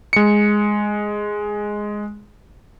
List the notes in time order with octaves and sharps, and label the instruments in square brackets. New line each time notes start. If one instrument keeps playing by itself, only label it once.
[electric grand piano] G#3 C#7